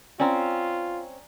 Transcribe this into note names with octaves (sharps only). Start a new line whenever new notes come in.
C4 C#4 F4 D5 G#5 A#5